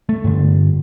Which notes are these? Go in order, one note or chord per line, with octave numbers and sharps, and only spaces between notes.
A3
G2 D3